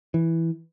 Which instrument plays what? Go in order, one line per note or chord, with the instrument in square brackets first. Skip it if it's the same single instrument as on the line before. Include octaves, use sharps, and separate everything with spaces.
[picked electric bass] E3